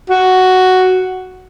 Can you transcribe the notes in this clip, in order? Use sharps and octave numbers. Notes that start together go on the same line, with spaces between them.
F#4